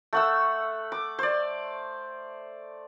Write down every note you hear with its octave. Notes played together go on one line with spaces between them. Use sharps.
A3 F#5 E6
D6
C5 D5